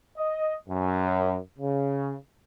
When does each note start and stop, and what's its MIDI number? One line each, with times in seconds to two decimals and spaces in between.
0.17 0.55 75
0.69 1.36 42
1.59 2.13 49